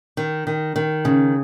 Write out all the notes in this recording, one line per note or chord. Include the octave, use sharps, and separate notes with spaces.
D#3
D#3
D#3
C#3